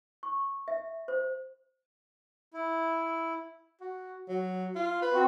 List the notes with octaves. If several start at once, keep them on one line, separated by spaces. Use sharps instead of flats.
C#6
E5
C5
E4
F#4
F#3
F4
B4
C4 F#4